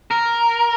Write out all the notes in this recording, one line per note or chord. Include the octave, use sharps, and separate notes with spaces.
A#4